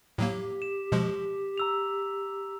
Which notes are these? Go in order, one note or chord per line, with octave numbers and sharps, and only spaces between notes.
A2 F#3 A#3 G4
E7
B2 F3 G#3
A#5 E6 F7